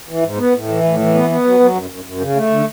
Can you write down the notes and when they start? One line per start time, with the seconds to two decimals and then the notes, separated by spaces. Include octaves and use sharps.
0.09 E3
0.23 G#2
0.38 B3
0.54 A2
0.68 E3
0.84 A2
0.99 E3
1.14 B3
1.30 B3
1.44 F#3
1.60 F#3
1.75 F#2
1.90 F#2
2.05 F#2
2.20 C#3
2.35 A3
2.50 D3